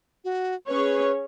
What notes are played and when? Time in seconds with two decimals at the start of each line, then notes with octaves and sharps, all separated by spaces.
0.24 F#4
0.68 C#4 G#4 B4 C#5